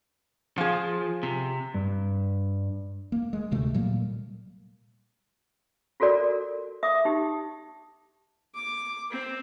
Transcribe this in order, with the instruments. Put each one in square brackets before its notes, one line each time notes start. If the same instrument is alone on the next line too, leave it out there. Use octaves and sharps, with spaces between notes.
[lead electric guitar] F3 [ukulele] F4 G#4
[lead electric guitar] C3
[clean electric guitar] G2
[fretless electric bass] A#3
G#3
D2 C3 A3
A#2 F#3 G3 A#3
[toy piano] F4 F#4 A4 A#4 D5
E5 D6 D#6
D#4 G4
[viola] D6
C4